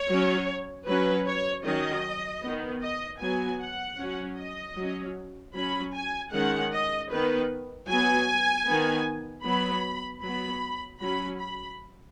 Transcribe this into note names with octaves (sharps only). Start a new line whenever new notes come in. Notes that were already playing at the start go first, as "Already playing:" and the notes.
Already playing: C#5
F#3 C#4
F#3 C#4 B4
C#5
D#3 F#3 C#4 D#5
D#3 B3
D#5
F#3 B3 G#5
F#5
F#3 C#4
D#5
F#3
C#4
F#3 C#4 B5
G#5
D#3 G#3 C#4 F#5
D#5
D#3 B3 B4
F#3 B3 G#5
D#3 B3
F#3 B3 B5
F#3 B3 B5
F#3 C#4 B5
B5